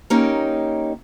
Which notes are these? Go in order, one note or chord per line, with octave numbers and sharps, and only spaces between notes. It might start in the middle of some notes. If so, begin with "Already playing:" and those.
A#3 C#4 D#4 G4 A#4